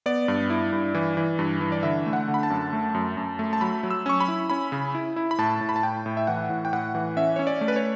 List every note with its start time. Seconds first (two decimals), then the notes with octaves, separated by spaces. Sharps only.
0.06 B3 D5
0.28 G2
0.50 E4
0.73 G2
0.94 E3
1.17 E3
1.39 G2
1.61 E3
1.72 D5
1.83 D3 E5
2.06 A3
2.13 F#5
2.28 D3
2.34 B5
2.43 A5
2.50 F#2
2.73 A3
2.94 F#2
3.17 F#2
3.39 A3
3.53 A5
3.61 F#3 B5
3.83 F#3
3.91 E6
4.06 C#4 C#6
4.20 B5
4.28 E4
4.50 C#4 B5
4.72 C#3
4.95 E4
5.16 E4
5.31 B5
5.38 A2 A5
5.61 A2
5.69 B5
5.76 A5
5.83 A2 G5
6.06 A2
6.17 E5
6.27 E3 F#5
6.50 A2
6.65 G5
6.73 A2 F#5
6.95 E3
7.17 C#4 E5
7.36 C#4 C#5
7.47 D5
7.61 A3
7.68 B4
7.76 C#5